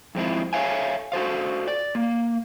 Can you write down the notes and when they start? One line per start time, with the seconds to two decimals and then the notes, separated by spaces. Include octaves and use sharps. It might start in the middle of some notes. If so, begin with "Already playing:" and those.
0.15 F2 G#3 C4 E4
0.53 A4 C#5 E5 F5 G#5
1.12 F#4 A4 C5 F5
1.68 D5
1.95 A#3